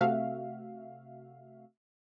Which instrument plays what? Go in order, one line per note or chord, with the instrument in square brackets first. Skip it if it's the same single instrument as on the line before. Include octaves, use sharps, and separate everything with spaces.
[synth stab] C3 A3 F#4 E5 F5